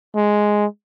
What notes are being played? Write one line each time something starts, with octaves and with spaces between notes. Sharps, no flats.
G#3